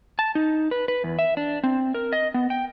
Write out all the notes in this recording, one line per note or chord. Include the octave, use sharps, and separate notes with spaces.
A5
D#4
B4
B4
E2
E5
D4
C4
A#4
D#5
B3
G5